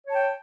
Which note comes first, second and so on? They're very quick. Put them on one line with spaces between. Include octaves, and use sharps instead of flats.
C#5 A5 G5